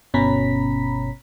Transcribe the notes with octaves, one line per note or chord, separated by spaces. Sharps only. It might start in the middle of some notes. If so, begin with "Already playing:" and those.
G1 B2 C#4 A#5 B5 B6